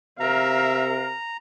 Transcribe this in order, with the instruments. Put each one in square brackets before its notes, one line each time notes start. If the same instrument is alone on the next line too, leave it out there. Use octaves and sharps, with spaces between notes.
[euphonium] C3 [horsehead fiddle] A#4 F5 [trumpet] E5 [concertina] A#5